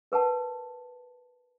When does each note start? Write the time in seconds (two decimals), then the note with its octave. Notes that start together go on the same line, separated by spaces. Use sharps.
0.12 A#4 B4 F#5 A5